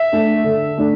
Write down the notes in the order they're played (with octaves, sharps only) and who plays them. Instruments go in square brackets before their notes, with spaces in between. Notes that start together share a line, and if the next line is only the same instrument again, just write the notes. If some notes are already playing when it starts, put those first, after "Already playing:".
Already playing: [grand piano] E5
[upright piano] A3 D4 A4
D3
A3 D4